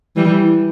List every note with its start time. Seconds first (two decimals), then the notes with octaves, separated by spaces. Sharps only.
0.16 E3 G3